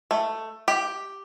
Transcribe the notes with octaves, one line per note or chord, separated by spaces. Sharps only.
A3
G4